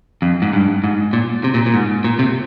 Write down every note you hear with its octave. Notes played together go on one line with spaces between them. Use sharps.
F2
G#2
G2
G#2
A#2
C3
A#2
A#2
G#2
A#2
C3